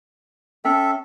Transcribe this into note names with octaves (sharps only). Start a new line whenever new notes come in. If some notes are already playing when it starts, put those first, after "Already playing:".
C#4 A4 E5 G5